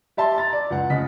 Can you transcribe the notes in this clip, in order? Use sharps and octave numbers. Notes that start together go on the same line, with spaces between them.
G4 E5 A5 C6
A#5 A6
D5
C#2 F#5
F1 C#3 D#5 B6